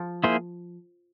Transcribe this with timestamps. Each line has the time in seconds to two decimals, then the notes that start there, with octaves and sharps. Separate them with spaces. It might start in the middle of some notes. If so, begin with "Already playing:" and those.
Already playing: F3
0.24 A#3 E4 G#4 C5